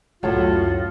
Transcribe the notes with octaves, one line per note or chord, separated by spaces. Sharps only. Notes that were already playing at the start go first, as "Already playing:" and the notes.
C#2 F#2 A2 F4 F#4 C#5 A5